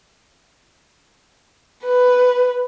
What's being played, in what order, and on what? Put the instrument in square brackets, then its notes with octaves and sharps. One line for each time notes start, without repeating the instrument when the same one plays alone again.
[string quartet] B4